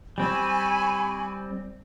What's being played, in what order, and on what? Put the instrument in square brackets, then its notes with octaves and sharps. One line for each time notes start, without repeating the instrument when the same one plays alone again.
[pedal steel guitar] G3 C4 [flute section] G#5 B5 C#6